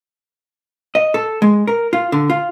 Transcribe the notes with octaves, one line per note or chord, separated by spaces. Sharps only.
D#5
A4
G#3
A#4
F4
D3
F4